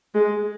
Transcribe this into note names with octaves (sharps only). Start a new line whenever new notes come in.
G#3